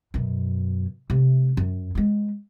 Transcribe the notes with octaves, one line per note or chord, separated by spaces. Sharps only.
F#2 B2
C3 A3
F#2
G#3 B3